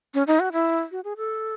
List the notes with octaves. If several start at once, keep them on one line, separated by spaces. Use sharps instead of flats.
C#4
D#4
F#4
E4
F#4
G#4
A4